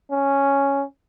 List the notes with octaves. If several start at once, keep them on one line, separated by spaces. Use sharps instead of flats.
C#4